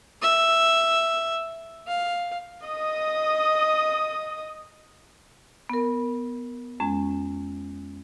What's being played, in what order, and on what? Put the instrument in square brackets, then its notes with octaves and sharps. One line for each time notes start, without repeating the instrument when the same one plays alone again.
[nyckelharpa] E5
F5
[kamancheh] D#5 D#6
[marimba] B3 A#4
F2 G#3 C#4